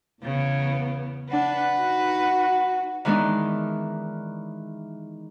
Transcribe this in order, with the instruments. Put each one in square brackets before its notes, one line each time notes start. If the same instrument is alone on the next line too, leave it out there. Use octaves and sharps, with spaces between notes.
[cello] E2 B3 [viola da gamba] C#3
[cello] D4 [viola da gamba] B4 [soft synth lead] F#5
[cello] D#4 F#4
[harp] D#3 E3 G#3 B3 D4 D#4